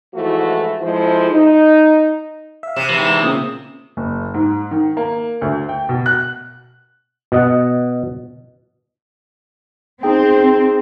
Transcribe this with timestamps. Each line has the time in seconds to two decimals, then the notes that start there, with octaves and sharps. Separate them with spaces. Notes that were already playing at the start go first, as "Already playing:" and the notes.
0.14 G#2 E3 F3 A3 E4 F#4
0.82 F2 F3 G#3 E4 C5
1.30 D#4
2.63 E5 F5
2.76 C3 E7
2.89 G#2 E3 E7
3.23 A#2 C#3 C4 D#6
3.97 F#1
4.34 G#2
4.71 D#3
4.97 A#3
5.42 D2
5.69 G5
5.89 B2
6.06 F#6
7.32 B2 D#5 F#5
10.03 C4 D#4 G#4 G5